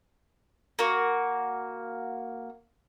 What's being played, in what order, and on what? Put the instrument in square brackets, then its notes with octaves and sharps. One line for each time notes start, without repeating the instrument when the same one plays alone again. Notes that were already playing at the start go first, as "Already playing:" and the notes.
[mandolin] A#3 F#4